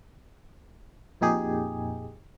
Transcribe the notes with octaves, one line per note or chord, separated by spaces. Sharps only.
F2 A#2 D#4 G4 G#4